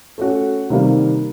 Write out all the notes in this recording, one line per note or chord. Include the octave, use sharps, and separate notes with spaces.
A3 C#4 F#4
C3 D#3 G3 A#3